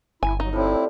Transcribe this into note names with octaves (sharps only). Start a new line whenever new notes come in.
G1 E4 G#5
F#3 D#4
A2 F3 G3 C4 E4